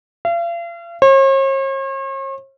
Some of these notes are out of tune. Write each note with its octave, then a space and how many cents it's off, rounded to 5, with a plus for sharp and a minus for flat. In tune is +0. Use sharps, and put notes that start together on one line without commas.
F5 -40
C#5 -45